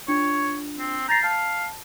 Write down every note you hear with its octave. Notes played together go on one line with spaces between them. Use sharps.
D4 F4 C#5
C4
A#5 G6 A6 C7
F5 A5